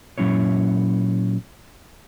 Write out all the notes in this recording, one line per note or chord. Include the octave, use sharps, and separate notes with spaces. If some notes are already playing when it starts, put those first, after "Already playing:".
A#2 F#3 C#4 E4 C#5